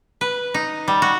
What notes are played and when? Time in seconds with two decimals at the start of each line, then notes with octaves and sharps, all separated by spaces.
0.21 B4
0.54 D#4
0.88 G3
1.02 F#4